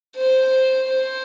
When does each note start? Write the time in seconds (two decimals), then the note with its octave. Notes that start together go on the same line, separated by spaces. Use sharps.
0.16 C5
0.87 C5